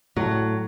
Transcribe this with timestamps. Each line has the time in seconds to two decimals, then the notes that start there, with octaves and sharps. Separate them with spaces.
0.16 A2 F#3